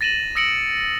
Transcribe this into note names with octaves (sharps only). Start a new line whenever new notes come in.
A6 A#6 D#7 E7 F#7
D#6 E6 A#6 C#7 D7 F#7